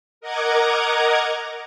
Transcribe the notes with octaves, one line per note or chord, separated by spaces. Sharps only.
A#4 D#5 F#5 A#5 D6 G#6